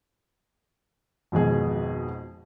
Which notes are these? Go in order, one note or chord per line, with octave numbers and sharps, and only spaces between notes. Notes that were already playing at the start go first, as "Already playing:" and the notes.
G#1 F2 B2 G#4